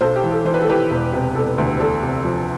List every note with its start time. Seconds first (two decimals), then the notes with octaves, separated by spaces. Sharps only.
0.01 B1 A4 C5
0.16 G4
0.23 E3
0.31 A4
0.45 E3 C5
0.54 B4
0.61 A4
0.68 E3 G4 B4
0.90 E1
1.13 C3
1.35 E1 A4
1.58 D2
1.80 E2 A4
2.03 C3
2.25 F3